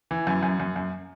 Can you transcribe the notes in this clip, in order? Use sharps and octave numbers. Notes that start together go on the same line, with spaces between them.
E3
F#2
F#2
F#2
F#2